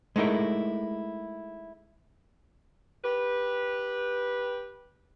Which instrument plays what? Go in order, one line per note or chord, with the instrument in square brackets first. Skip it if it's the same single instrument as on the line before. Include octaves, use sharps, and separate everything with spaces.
[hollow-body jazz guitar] G#3 A3 D#4 E4 A#4
[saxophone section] G4 B4